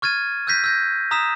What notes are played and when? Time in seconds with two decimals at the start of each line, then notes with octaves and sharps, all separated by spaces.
0.02 C#6 F6 G#6 A6 D#7
0.47 E6 F#6 G6 A#6 B6 D#7
0.64 E6 G6 A#6
1.11 A#5 D#6 E6 B6 E7